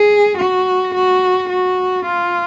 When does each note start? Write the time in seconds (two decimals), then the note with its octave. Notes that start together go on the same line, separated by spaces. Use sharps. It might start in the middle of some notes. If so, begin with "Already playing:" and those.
Already playing: G#4
0.38 F#4
0.95 F#4
1.50 F#4
2.06 F4